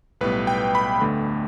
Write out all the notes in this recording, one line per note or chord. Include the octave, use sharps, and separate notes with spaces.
B1 A2 G3 B3 B4
G5
B5
D2 D3 A3